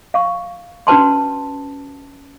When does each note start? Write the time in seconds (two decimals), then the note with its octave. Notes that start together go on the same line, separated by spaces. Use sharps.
0.14 F5 C#6
0.87 C#4 F#4 B4 A5 C6